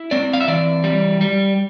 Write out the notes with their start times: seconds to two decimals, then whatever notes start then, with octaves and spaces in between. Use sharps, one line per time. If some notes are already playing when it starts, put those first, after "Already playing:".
Already playing: E4
0.11 C4 D5
0.33 F5
0.40 E5
0.48 E3 D5
0.84 G3
1.21 G3